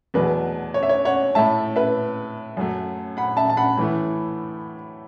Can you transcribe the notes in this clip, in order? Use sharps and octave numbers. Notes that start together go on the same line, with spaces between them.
E2 B2 F#3 A3 B4
C#5
E5
C#5
C#5 F#5
A2 A3 E5 A5
B4 E5
F#2 F#3 A3
F#5 B5
E5 A5
A5
F#5 B5
A2 E3 A3